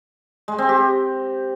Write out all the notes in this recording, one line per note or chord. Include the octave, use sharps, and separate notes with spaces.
G#3
C4
G4